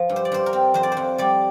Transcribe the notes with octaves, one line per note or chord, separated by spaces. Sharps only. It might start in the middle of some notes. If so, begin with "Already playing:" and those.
Already playing: F3
G2
C5
D5
G2 C5
A#4
C4
F2 C5
D5
C5
F2
G3 D5